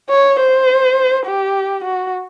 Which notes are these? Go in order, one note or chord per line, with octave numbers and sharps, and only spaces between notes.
C#5
C5
G4
F#4